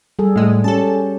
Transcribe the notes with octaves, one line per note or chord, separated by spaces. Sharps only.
G3 G#4 A4
A2 G#3
C#4 G4 A4 A5